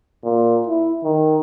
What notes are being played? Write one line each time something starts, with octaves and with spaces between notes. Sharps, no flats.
A#2
E4
D#3